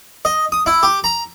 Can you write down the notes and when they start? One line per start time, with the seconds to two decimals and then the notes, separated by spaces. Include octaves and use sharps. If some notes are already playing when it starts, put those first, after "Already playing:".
0.25 D#5
0.52 D#6
0.66 E4
0.83 G4
1.04 A#5